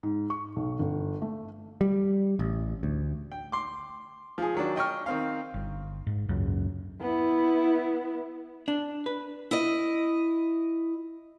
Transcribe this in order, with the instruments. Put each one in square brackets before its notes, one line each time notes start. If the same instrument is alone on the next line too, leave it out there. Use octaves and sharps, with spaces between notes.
[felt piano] G#2
C#6
B1
G1
A3
[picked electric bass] G3
A1
D2
[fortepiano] G5
C6 D6
F3 G#4
D#3 F#3 D4
D#5 G5 C#6 F6
D#3 C4 F5
[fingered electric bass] G1
G#2
C#2 F#2 C#3
[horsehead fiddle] B3 E4
[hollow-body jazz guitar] D4
B4
[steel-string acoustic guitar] E4 D#5